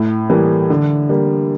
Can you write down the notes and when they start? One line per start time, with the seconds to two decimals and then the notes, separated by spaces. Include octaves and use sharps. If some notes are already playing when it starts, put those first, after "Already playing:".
Already playing: A2
0.30 E3 G3 A#3
0.70 D3
1.09 G3 A#3